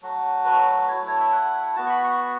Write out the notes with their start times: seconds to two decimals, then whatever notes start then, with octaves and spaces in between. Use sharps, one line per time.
0.02 F#3 A3 F#4
0.45 B4
0.88 A3 E4 C#5
1.08 C#5
1.20 E5
1.32 F#5
1.76 B3 F#4 A5
1.86 C#6
1.90 B5
2.04 C#6